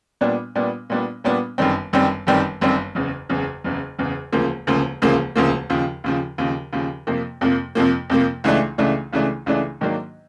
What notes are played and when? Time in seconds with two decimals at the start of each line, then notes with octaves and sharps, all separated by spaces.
0.21 A#2 G3 B3 D4
0.55 A#2 G3 B3 D4
0.90 A#2 G3 B3 D4
1.24 A#2 G3 B3 D4
1.58 G1 F#2 D#3 G3 C4
1.93 G1 F#2 D#3 G3 C4
2.27 G1 F#2 D#3 G3 C4
2.61 G1 F#2 D#3 G3 C4
2.95 F#1 E2 C#3
3.29 F#1 E2 C#3
3.64 F#1 E2 C#3
3.99 F#1 E2 C#3
4.32 E1 D2 C#3 F3 A#3
4.67 E1 D2 C#3 F3 A#3
5.02 E1 D2 C#3 F3 A#3
5.36 E1 D2 C#3 F3 A#3
5.70 D#2 C#3 F3
6.04 D#2 C#3 F3
6.38 D#2 C#3 F3
6.73 D#2 C#3 F3
7.07 F2 C3 F3 A#3
7.41 F2 C3 F3 A#3
7.75 F2 C3 F3 A#3
8.10 F2 C3 F3 A#3
8.44 C#2 C#3 E3 A3 D4
8.78 C#2 C#3 E3 A3 D4
9.13 C#2 C#3 E3 A3 D4
9.46 C#2 C#3 E3 A3 D4
9.81 G#2 D#3 F#3 A#3 D4